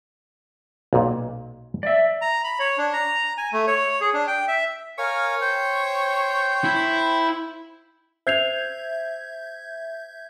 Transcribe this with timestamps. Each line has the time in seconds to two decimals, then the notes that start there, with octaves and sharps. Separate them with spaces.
0.93 B1 A#2
1.83 D5 E5
2.22 A#5
2.44 B5
2.60 C#5
2.78 D4
2.93 A#5
3.38 G#5
3.53 A3
3.67 C#5
4.01 G#4
4.14 D4
4.27 G5
4.48 E5
4.98 A#4 C#5 F5 G#5
5.41 C5 G5
6.65 E4
8.27 C5 E5 G6 G#6 C7 F7